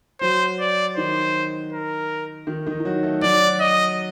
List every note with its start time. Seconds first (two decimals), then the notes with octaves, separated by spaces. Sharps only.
0.21 F#3 F#4 C5
0.60 D5
0.96 D#3 D#4 C5
1.73 A#4
2.47 D#3 D#4
2.67 D#3 D#4
2.80 D#4
2.85 F#3 F#4
3.03 A3 A4
3.22 F#3 F#4 D5
3.60 D#5